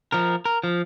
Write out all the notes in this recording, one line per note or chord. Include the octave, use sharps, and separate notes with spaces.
F3 A#4
A#4
F3